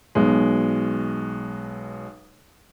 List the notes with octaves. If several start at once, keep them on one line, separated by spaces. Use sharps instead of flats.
B1 B2 G#3